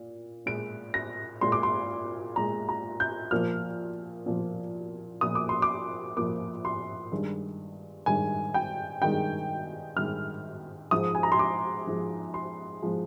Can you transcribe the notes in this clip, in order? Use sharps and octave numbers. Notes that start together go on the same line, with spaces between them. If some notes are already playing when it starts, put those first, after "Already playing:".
Already playing: A#2
A#2 G#3 D7
A#6
A#2 G#3 C6
D6
C6
A#2 G#3 A#5
A#5
G6
A#2 F3 A#3 F6
A#2 F3 A#3
A#2 F3 A#3 D#6
D6
C6
D6
A#2 F3 A#3 D6
C6
G2 D#3 G#3
G2 D#3 G#3 G#5
G5
G2 D#3 G#3 G5
G2 D#3 G#3 F6
G#2 F3 G#3 D#6
G#5
A#5
C6
D6
G#2 F3 G#3
C6
F3 G#3